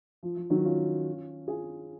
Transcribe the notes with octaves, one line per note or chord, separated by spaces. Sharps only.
F3
F3
D#3 F#3
C#4 F4
F4 G#4